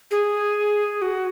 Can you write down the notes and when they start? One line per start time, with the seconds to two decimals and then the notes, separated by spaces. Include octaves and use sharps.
0.11 G#4
1.02 F#4